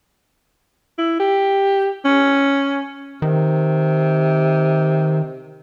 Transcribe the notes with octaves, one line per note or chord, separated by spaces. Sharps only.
E4
G4
C#4
C3 D#3